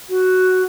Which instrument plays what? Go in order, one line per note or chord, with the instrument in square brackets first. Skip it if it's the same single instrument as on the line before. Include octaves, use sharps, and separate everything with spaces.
[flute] F#4